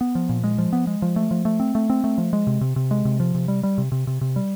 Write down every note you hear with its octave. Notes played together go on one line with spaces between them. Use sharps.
B3
F3
A#2
G#3
F3
B3
G#3
F3
A3
F3
A3
C4
A3
C4
A3
F3
G#3
C3
C3
C3
G#3
C3
F3
C3
G3
G3
C3
C3
C3
C3
G3